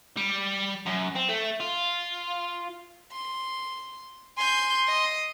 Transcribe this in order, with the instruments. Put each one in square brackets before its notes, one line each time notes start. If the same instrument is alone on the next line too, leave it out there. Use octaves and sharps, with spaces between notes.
[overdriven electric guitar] G3
F#2
C4
A3
F4
[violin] C6
[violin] G#5 G6 [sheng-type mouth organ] C6
[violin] D#5